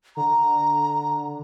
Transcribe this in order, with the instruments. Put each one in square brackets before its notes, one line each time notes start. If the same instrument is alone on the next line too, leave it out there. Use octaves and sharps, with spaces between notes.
[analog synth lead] D3 [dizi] A#5